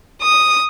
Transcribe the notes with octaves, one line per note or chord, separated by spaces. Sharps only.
D#6